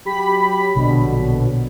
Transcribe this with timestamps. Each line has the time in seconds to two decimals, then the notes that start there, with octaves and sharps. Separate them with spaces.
0.05 F#3 G4 B5 B6
0.75 A#1 B2 D3 F#3